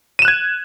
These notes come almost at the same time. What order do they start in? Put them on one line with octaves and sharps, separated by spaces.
D#7 E7 F#6 G#6